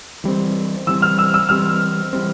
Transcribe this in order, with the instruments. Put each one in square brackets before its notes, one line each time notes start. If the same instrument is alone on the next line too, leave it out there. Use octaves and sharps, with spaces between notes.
[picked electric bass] E3 G3 C4
[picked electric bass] E3 G3 C4 [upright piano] E6
[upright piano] F6
E6
E6
[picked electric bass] E3 G3 C4 [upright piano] F6
[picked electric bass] E3 G3 C4